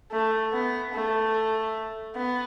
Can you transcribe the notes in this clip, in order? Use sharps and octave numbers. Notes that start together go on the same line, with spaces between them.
A3
B3
A3
B3